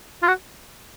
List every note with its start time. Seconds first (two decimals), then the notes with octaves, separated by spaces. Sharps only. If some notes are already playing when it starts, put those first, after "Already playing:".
0.23 F4
0.28 F#4